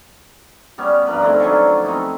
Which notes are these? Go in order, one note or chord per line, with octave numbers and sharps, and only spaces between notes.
G3 B3 C#4
G2 F3 A#4 B4
D#3 A3 C4 E4
D3 F3 F#3 C#4
C4 D#4 E4